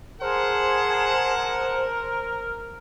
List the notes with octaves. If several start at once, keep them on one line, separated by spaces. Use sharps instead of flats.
G#4 A#4 C5 F#5 A5 C6